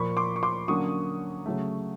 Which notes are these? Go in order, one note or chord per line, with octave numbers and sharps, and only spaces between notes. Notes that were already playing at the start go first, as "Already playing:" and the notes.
Already playing: A#2 F3 A#3 B5 C#6
C6 D6
C#6
C6 D6
D3 F#3 A#3 C#4 C#6 D#6
C#3 F#3 A3